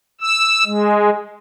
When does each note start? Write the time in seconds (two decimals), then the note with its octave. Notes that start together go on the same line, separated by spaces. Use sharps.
0.21 E6
0.65 G#3